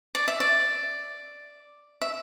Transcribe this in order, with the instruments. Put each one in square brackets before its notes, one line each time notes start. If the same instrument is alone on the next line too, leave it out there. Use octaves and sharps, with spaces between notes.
[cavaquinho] D5
E5
D5
E5